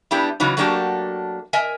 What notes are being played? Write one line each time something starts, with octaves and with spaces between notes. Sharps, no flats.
G3 B3 D4 E4 G4
C#3 E3 F#3 D#4
F#3 A3 A#3 D4 F#4 G4
A#4 D#5 E5 G#5